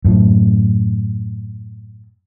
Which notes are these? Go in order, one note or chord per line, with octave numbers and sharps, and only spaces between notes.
F#2 A2